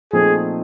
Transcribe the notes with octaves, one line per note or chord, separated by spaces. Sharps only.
A#2 F3 A3 C4 D#4 G#4